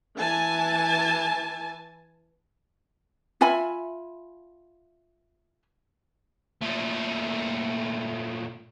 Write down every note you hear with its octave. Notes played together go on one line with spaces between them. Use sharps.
E3 G#5 A5
F4 E5 G#5 B5
A#2 A3